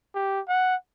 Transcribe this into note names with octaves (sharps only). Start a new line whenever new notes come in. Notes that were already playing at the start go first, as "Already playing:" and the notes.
G4
F#5